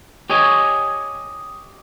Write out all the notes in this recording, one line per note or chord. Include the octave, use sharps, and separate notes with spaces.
G4 C#5 D#5 G#5